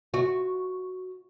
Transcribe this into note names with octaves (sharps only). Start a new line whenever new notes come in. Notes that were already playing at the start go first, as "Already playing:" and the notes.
F#4